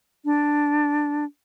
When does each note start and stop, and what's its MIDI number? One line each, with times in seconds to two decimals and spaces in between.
0.25 1.25 62